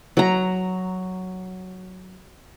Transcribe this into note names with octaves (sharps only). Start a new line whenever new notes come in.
F#3 A#5